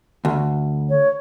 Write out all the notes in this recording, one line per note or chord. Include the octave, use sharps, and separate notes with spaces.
D2
C#5